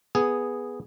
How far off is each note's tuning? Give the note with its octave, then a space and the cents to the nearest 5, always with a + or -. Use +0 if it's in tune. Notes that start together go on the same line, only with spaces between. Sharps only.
B3 +0 G#4 +0